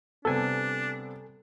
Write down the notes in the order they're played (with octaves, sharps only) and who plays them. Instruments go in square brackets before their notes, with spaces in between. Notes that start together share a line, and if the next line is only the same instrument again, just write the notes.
[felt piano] C3 G3 B3 [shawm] D4 [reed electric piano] A4 G#5